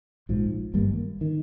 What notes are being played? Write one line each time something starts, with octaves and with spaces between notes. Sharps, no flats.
A#1 G#2 F3
G#1 G2 G3 A#3
D#3